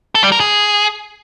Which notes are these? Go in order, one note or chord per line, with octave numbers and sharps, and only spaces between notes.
A4
G3
A#4
G#4